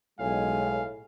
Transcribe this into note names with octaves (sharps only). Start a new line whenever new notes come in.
B1 A2 G#3 F5 G#5